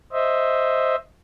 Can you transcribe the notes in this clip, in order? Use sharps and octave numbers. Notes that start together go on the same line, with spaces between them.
C5 D#5 E5